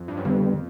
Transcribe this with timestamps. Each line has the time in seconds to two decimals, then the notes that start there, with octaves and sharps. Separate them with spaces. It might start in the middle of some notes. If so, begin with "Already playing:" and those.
Already playing: F2
0.08 G2
0.17 F#2
0.25 F2 D3 G3 B3